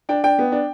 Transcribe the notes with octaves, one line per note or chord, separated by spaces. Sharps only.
D4 G5
D4 G5
B3
D4